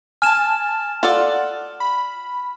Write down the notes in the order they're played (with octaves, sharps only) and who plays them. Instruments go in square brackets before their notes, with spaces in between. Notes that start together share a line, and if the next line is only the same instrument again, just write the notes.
[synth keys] G#5 A5 [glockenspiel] F6 E7
[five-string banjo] F4 A4 D5 [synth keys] F#5
[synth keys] B5